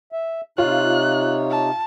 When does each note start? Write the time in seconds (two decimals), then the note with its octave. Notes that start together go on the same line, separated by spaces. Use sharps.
0.12 E5
0.58 C3 D#4 F4 C#5 F#6
1.51 A5